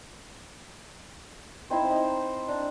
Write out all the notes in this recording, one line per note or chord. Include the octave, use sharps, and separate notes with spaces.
C4 D#4 E4 C5
D#4
D4